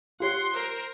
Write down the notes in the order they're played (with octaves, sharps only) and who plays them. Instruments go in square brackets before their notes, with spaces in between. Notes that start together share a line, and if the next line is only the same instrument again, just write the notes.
[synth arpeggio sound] F4 G4 C#5 [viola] F#5 C6
[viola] A#4 C5